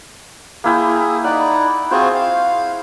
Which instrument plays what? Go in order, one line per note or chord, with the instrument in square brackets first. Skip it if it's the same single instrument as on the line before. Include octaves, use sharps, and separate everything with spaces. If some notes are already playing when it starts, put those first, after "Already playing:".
[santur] A#3 E4 G5 [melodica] G#4
[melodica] D#4 D5 [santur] F#5 B5
[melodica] C4 F4 F#4 [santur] G#4 C5
[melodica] F5